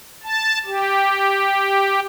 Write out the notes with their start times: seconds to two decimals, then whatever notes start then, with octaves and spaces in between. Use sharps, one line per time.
0.24 A5
0.66 G4